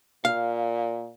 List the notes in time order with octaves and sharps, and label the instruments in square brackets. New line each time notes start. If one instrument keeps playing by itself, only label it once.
[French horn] A#2 [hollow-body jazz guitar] F5